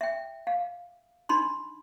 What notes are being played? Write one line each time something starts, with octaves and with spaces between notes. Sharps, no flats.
E5 G5
F5
D4 D#4 B5 C6